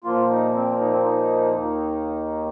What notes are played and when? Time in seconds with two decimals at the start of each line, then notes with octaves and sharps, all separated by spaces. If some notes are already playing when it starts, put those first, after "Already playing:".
0.04 A#2 F3 A#3 F4
0.30 D#4
0.55 C4
0.80 D#4
0.91 C4
1.04 D#4
1.54 D#2 D#3 A#3